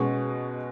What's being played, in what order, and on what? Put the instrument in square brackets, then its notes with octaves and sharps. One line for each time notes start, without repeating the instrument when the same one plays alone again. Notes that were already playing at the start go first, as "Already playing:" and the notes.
Already playing: [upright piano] B2 G#3 C#4 F#4